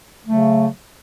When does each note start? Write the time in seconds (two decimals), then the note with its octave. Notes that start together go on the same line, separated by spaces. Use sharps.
0.26 C#3 F#3 A3